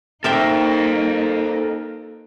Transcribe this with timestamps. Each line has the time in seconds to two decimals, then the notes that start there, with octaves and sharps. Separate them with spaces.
0.24 A#3 D#4 A4 A#4 C5 E5 G5